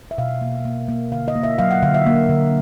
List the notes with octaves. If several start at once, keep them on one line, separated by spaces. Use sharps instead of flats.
E5
B2 F5
A#3
A#3
A#3
D3 F5
D#5
A#3
E5
F#3 F5
F#5
D3 F5
E5
A#3
D3